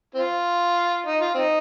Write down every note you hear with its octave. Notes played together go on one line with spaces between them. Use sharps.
C4 F4
D#4
F4
C4 D#4